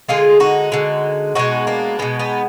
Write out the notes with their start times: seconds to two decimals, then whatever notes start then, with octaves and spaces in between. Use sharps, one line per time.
0.08 D3 G#3 F4 G#4
0.40 D#4 F#4
0.72 D3 G#3
1.35 B2 G#3 D#4 F#4
1.67 A#3 D4
1.99 B2 G#3 B3
2.19 B3 D#4